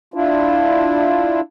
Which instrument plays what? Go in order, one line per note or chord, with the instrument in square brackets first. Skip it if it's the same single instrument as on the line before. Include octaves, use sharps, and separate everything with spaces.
[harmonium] D4 E4 F4